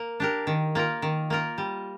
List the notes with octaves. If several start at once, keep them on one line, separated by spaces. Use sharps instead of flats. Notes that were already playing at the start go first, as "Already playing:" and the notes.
Already playing: A#3
D4 G4 A#4
D#3
A#3 F4 A#4
D#3
A#3 F4 A#4
G3